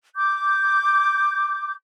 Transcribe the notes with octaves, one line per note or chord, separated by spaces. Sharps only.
D6 G6